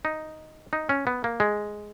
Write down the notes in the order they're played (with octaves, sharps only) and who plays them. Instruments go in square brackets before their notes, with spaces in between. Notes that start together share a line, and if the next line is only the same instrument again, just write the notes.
[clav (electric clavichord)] D#4
D#4
C#4
B3
A#3
G#3